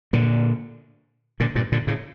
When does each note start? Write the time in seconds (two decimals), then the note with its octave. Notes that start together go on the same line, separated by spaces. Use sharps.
0.13 A#2 D3
1.40 A#2 D3
1.55 G2 A#2
1.72 A#2 D3
1.87 A2 C#3